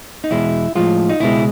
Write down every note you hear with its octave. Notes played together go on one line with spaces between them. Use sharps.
D#4
E2 B2 G#3 E4
A2 F3 G#3 F4
D#4
C#2 B2 G#3 E4